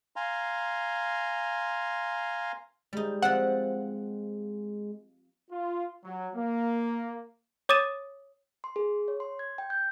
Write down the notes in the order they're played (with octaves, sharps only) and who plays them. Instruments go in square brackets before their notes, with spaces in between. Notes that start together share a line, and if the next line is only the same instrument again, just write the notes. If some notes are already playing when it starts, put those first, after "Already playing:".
[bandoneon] F5 G#5 A#5 C6
[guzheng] G3 D#4 [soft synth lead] G#3
[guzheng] F3 C4 [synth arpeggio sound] F#5
[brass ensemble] F4
F#3
A#3
[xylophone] C#5 D6 D#6 A6 D#7 E7
[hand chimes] C6
G#4
C#5
C6
G#6
G5
G6